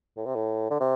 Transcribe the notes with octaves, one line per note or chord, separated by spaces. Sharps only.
A2
C3
A2
D3
C3